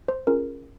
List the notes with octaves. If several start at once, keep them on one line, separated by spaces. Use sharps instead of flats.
C5
C#4 F4 G#4 A#4